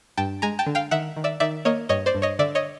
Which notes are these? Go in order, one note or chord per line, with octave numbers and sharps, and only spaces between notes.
G2 G5 A5
G#3 G#5 A#5
G5 A5
D3
F5 G5
D#3 E5 F#5
D#3
D5 E5
D#3 D5 E5
A#3 C#5 D#5
G2 C#5 D#5
C5 D5
G2
C#5 D#5
D3 D5 E5
C#5 D#5